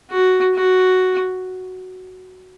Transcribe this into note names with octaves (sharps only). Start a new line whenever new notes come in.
F#4
F#4